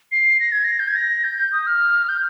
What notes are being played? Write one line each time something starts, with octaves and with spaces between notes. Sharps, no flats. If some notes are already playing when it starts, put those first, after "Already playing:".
C7
A#6
G#6
A#6
G6
G#6
A#6
G6
D#6
F6
G6